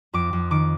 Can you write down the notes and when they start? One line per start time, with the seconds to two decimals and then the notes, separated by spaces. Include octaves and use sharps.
0.13 F2 D6
0.33 F2
0.51 D#3 D6